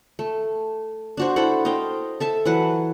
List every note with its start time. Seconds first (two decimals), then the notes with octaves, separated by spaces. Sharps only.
0.19 A3
1.17 D4 F#4 C5
1.36 E4 A4 C5 F#5
1.65 C5 D#5 F5 G5
2.20 A4 E5 A5
2.45 E3 F#3 B4 F#5